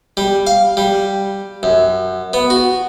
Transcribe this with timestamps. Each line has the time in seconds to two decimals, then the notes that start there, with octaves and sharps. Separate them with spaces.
0.17 G3
0.47 F5
0.77 G3
1.63 F#2
2.33 B3
2.50 F#4